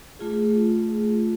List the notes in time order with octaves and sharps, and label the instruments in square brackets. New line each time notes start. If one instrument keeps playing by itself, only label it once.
[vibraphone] A3 F4 G#4